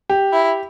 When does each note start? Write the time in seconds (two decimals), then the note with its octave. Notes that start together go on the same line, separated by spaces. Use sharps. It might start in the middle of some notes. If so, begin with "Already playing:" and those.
0.10 G4
0.33 E4